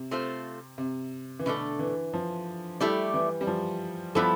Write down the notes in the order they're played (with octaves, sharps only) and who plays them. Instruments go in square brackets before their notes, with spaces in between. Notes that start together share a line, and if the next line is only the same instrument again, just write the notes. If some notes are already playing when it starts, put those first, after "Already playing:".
Already playing: [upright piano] C3
[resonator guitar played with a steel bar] A3 C4 F4 C5
[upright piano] C3
E3
[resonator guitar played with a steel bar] B2 A3 D4 A4 [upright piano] D3
[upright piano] E3
F3
[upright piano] G3 [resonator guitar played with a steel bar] A3 E4 G4 D5
[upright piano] E3
G3
F3
[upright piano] F3 [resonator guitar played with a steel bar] G3 B3 E4 A4